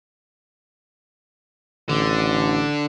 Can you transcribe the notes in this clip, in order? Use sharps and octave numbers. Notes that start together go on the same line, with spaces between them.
A1 D3